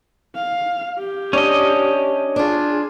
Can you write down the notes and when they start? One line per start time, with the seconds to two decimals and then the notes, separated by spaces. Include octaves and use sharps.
0.35 F5
0.99 G4
1.33 C#4 D4 D#5
2.36 D4 F4 G#4